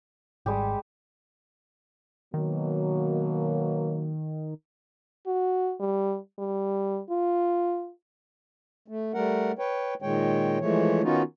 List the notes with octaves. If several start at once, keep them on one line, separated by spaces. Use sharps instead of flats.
G#1 G3 G#3 G4
B2 D#3 F#3 A#3
F#4
G3
G3
F4
A3
G3 A3 A#4 F#5
B4 C#5 G5
A#2 D#3 G#3 C#5 G5
E3 F3 G#3 A3 C#5
D#3 B3 C#4 D#4 F4 F#4